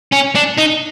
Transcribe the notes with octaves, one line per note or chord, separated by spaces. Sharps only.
C#4
D4
D#4